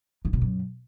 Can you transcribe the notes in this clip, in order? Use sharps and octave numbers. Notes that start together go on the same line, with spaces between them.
G#2
B2
F#2